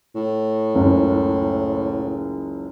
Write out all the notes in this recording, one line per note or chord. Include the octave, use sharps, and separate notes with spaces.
A2
F#1 C#2 G#3